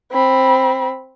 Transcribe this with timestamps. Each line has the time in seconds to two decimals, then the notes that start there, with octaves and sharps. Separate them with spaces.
0.12 C4 B5